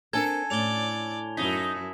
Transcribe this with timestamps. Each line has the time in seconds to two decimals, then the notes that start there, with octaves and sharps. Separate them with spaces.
0.13 C4 D4 A4 A#4 G#5 A5 G#6
0.50 A2 C#4 D5 F7 G7
1.37 F#2 D#4 E4 B6